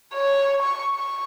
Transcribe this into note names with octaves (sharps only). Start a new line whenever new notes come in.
C#5
C#6
C#6